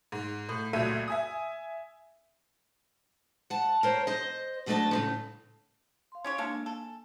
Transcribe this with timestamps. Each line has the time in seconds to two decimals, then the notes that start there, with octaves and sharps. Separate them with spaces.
0.12 G#2
0.49 A2
0.73 C#2 A#2 F#3 A3 E5 D#7
1.08 E5 G#5 D#6
3.50 F#5 A5
3.83 A#4 C5 C#5
4.07 C5 D#5
4.66 B2 F#3 A3 D4 D#5 A5
4.91 A2 C#3 F3
6.12 F5 C6
6.24 C#4 G4 C#5
6.38 G#3 A#3 D4 A4 F5
6.51 A#3
6.66 A4 G#5